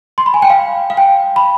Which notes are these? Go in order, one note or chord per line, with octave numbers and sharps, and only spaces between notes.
C6
B5
G#5
G5
F5
F5
G5
B5